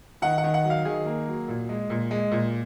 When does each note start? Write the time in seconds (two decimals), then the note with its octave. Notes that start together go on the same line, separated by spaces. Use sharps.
0.22 D#3 F#5
0.38 F#5
0.44 D#3
0.54 F#5
0.64 F#3
0.70 F5
0.85 D#3 G#4
1.06 A#3
1.28 F#3
1.48 A#2
1.69 G#3
1.90 A#2
2.11 G#3
2.31 A#2